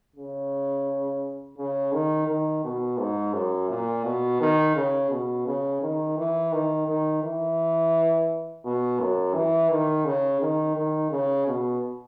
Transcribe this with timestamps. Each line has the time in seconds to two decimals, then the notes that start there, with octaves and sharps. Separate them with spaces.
0.16 C#3
1.58 C#3
1.93 D#3
2.28 D#3
2.64 B2
2.99 G#2
3.34 F#2
3.69 A#2
4.05 B2
4.40 D#3
4.76 C#3
5.11 B2
5.46 C#3
5.82 D#3
6.17 E3
6.52 D#3
6.87 D#3
7.23 E3
8.65 B2
9.00 F#2
9.35 E3
9.71 D#3
10.05 C#3
10.41 D#3
10.76 D#3
11.11 C#3
11.47 B2